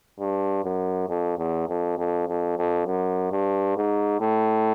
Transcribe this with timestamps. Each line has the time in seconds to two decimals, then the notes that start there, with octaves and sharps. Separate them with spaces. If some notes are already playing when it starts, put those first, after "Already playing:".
0.19 G2
0.64 F#2
1.09 F2
1.38 E2
1.69 F2
1.98 F2
2.28 F2
2.58 F2
2.87 F#2
3.32 G2
3.76 G#2
4.21 A2